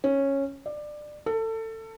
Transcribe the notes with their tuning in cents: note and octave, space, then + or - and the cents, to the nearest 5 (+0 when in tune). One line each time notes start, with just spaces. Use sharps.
C#4 -10
D5 +20
A4 +25